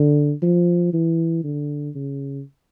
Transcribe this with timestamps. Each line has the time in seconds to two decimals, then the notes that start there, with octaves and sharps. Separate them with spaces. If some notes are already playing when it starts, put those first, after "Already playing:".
Already playing: D3
0.42 F3
0.93 E3
1.44 D3
1.95 C#3